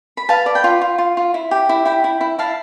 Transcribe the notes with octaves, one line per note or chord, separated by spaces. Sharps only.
B5
B4 F5 A5
D5
G5 B5
F4
F4
F4
F4
E4
G4
E4
E4 G5 B5
E4
E4
E4 F5 A5